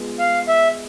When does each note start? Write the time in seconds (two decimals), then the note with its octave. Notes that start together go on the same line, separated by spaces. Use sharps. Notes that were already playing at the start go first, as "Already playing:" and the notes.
Already playing: G#3 B3 F4
0.19 F5
0.48 E5